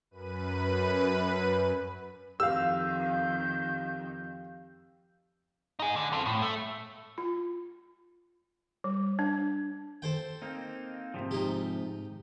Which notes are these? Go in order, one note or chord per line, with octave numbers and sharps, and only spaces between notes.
F#2 B4 D#7
F2 D#3 G4 F5 E6 G6
D#4 G#4
D3
C4 A4
A2
A3
F4
G3
D4
A4 C5 G5
A#3 C4 D#4
G#2 C3 F3
D#4 G4